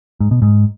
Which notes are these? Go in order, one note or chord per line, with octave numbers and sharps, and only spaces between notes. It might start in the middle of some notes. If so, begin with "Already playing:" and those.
G#2
B2
G#2